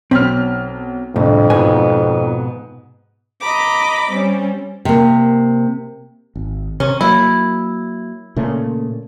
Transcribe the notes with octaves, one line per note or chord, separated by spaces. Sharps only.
B1 C4 B5 F6
C2 F2 A2 D3
G#2 B2 B3 G#5
D#5 A#5 B5 D6
G3 C4 C#4
C3 A#3
G#1
C3 C#4
F#3 A#3 E4
A#2 C#3 A3